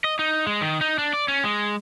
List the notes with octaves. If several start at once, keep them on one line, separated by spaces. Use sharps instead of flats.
D#5
D#4
G#3
D#3
D#4
D4
D5
C#4
G#3